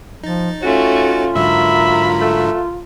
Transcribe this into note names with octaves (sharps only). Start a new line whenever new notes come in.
F3 D#4 A6
A3 C#4 F4 F#4
G#2 D3 F#3 A#4 E5 B5
A3